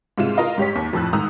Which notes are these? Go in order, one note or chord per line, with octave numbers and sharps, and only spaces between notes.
G#2 C3 G#3 F4 E7
F4 A#4 D#5 F5
G#2 G4 C#5 B6
D#2
F2 A2 F3 E6 F#6
G#2 D#3 A#5 D#6 E6